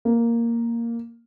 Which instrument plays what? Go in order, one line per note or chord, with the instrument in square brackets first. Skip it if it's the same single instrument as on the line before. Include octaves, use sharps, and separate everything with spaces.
[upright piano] A#3